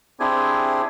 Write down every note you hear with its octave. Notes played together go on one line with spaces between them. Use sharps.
C4 D4 E4 G4 G#4 G#5